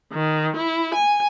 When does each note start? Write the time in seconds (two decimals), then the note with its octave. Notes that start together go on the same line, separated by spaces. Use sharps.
0.13 D#3
0.57 E4
0.94 G#5